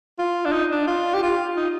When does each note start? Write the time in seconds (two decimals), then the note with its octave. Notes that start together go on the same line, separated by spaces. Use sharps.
0.19 F4
0.45 D4
0.53 D#4
0.71 D4
0.87 F4
1.14 G4
1.23 F4
1.57 D#4